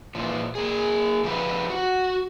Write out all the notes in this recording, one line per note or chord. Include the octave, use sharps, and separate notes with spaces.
A#2 E3 F3
A#3 G#4
D3 F3 G4 B4
F#4